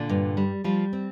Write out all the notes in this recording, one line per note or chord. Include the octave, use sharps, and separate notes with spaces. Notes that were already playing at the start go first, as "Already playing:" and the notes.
Already playing: A#2 D3 D4
G2
G3
F3 G3 F4
C4